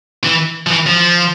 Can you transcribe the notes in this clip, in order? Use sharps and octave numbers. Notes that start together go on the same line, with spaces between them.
E3
F3
E3
F3